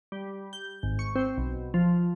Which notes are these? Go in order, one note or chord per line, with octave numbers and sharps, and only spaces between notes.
G3
G6
G#1
C#6
C4
B1
F3